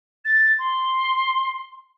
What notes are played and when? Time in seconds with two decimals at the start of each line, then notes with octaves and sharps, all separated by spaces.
0.24 A6
0.58 C6